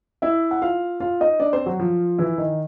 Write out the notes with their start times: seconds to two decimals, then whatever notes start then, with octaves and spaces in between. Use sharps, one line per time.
0.22 E4 E5
0.51 F#5
0.61 F4 F5
1.00 F4 F5
1.21 D#4 D#5
1.40 D4 D5
1.53 C4 C5
1.66 F#3 F#4
1.80 F3 F4
2.18 E3 E4
2.38 D#3 D#4